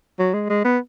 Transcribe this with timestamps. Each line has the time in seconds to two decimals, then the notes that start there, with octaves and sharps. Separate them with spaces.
0.19 F#3
0.34 G#3
0.50 G#3
0.65 B3